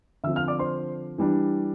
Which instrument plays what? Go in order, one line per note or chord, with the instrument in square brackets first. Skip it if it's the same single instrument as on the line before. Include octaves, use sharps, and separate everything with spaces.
[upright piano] D3 F3 C4 E5 E6
F5 F6
D5 D6
C5 C6
E3 G3 D4